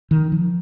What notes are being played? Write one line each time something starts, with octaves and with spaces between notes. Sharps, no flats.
D#3
F3